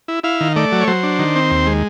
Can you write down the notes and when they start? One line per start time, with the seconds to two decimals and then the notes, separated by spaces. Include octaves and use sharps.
0.08 E4
0.24 E4 F5
0.41 D#3
0.56 A3 D5
0.72 F#3
0.81 C#5
0.87 F#3 C5
1.03 D4
1.19 D#3
1.36 C4
1.51 D#2
1.66 G#3